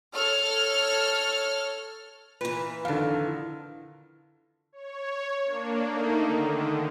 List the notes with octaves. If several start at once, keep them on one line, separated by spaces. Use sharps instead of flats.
A4 C#5 F6
A#2 E3 B4
F2 D3 D#3 F5
C#5
A#3 D4
A3 A#3 D#4
D3 D#3